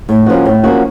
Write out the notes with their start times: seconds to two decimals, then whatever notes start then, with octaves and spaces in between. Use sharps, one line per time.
0.09 A2
0.26 F3 A#3 C#4 F#4
0.46 A2
0.64 F3 A#3 C#4 F#4